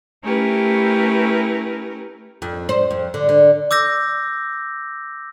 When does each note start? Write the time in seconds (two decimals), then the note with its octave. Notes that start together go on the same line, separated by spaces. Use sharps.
0.23 A3 C#4 E4 G4 A#4 B4
2.42 F2
2.69 C5
2.91 F2
3.14 D3
3.29 D3
3.71 D6 E6 G6 A#6